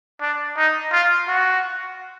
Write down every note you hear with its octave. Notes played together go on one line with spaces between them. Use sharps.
D4
D#4
F4
F#4